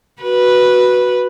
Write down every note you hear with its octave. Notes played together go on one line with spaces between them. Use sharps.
F#4 B4